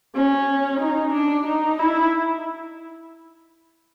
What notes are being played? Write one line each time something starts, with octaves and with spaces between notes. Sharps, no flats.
C#4
D#4
D4
D#4
E4